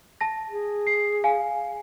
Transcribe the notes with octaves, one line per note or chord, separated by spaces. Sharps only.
A5 A#6
G#4
C7
F5 G#5